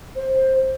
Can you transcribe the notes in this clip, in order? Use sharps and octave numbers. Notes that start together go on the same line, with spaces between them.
C5